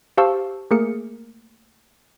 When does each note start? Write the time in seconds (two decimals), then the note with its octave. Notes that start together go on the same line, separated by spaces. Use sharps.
0.18 G4 C5 F5 A5 C#6 E6
0.71 A3 A#3 G#4 A#4 C#7